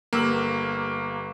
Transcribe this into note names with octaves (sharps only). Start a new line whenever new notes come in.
G1 A#3 E6 F#7